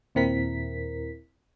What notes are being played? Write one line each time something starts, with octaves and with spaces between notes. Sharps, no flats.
D#2 A#2 C4 E4 A#4 B6